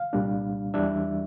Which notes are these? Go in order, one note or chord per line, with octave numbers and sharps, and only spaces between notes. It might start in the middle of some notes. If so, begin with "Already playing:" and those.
Already playing: F5
C2 A#2 G3 D4
E2 E3 G3 D4 E5